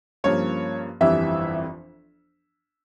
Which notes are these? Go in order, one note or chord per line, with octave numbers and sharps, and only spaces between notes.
G2 F3 A#3 C#4 C#5
G1 F2 E3 G3 E5